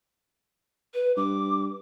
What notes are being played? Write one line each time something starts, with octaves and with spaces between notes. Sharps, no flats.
B4
G2 D6